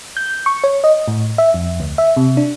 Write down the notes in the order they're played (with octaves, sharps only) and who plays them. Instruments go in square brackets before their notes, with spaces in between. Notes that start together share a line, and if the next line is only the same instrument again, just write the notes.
[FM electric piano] G6
C#6
C#5
D#5
A2
E5
F2
D2
E5
C3
D4